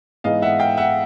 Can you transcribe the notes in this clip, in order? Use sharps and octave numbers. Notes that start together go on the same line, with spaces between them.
G#2 E3 G#3 B3 D#5 F5
E5 F#5
F5 G5
E5 F#5